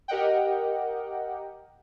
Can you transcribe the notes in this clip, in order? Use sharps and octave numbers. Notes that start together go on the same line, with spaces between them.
G4 A#4 D#5 F#5 G5